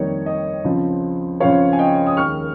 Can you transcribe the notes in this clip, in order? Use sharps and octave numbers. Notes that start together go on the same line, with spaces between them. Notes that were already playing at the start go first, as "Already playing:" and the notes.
Already playing: F2 D#3 G3 A#3 D#4 C#5 D#5
D#5
C#2 C#3 F3 C4 F4
C#2 C#3 F3 C4 F4 C#5 F5
G#5
D#5 G5
D#6
D#2 D#3 G#3 C#6 F6